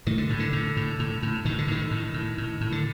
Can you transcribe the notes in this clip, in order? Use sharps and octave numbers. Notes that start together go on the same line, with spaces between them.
A2 D#3
D3
A2
D3
A2
A2
A2
A2
A2 D#3
D3
A2 D#3
A2
A2
A2
A2
D3